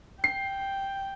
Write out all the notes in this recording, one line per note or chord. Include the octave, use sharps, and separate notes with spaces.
G5 C7